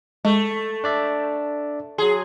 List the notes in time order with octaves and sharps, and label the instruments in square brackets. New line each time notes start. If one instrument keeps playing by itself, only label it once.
[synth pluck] G#3 [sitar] A3
[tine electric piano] D4 D5 E5
[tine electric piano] F#3 C6 [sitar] G#4